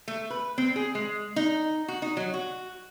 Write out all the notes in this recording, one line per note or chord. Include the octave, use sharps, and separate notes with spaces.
A3
B4
C4
G#4
G#3
D#4
F#4
D#4
F#3
F#4